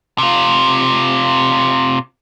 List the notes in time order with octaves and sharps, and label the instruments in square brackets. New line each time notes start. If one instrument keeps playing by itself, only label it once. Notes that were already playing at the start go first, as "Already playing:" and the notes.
[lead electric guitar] C3 F4